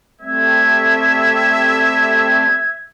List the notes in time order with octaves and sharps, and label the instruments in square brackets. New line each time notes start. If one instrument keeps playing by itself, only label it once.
[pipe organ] G3 A3 C4 [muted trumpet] E5 [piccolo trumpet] G#6